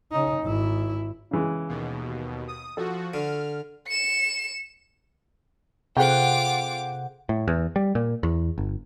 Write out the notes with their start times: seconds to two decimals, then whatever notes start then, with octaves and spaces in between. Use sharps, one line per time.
0.12 C#3 D#4
0.42 G#1 E4
1.31 C#3 E3 G#3
1.69 D#2 B2
2.48 D#6
2.77 F3 F#4 A4
3.14 D3 F6
3.87 C#7 E7
5.97 C3 F4 G#4 A4 C5 F#5 G5 D6
7.29 A2
7.48 E2
7.76 G3
7.95 A#2
8.23 E2
8.58 G1